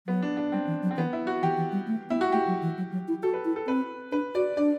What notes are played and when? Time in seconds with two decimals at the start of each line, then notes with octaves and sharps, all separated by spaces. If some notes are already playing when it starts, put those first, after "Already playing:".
0.07 F#3 B3
0.22 D4
0.37 D4
0.52 G3 C4
0.67 E3
0.83 F#3
0.91 C4
0.97 E3 B3
1.13 E4
1.27 F#4
1.42 E3 G4
1.57 E3
1.72 G3
1.87 A3
2.09 B3 E4
2.21 F#4
2.32 A3 G4
2.47 F#3
2.62 E3
2.77 F#3
2.92 F#3
3.08 E4
3.23 F#4 A4
3.33 B4
3.45 E4
3.56 A4
3.67 C4 B4
4.12 D4 B4
4.35 F#4 D5
4.57 D4 D5